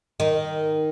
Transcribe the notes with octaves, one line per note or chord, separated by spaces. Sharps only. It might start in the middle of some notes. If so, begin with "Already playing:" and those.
D#3